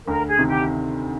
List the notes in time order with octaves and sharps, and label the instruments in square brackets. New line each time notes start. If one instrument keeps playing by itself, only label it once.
[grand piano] D2 [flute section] A#4
[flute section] G#4
[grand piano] C3 D#3
[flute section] G4